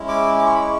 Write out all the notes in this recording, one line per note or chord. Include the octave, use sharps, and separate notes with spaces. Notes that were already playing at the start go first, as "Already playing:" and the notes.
Already playing: G#3 C#4 E4
D6
D6
C#6
B5
C#6